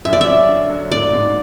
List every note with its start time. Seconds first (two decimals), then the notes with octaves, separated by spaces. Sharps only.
0.05 F#2 E5
0.13 D5
0.21 E5
0.27 C#4
0.48 D3
0.70 F#3
0.91 G#2 D5
1.13 G#2